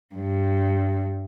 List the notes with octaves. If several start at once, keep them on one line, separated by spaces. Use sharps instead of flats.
G2